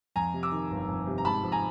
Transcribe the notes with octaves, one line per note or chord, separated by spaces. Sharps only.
F2 G#5 A#5
C3
D6 E6
D#3
G1
F2
C3
A#5
G#2 A5 B5
F3
G#5 A#5